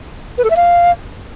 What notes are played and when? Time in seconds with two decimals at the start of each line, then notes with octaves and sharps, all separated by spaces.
0.38 B4
0.44 A4
0.50 E5
0.57 F5